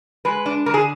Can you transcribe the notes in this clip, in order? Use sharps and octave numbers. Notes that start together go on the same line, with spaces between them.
G#3 B4
D4
D3 A#4
G#4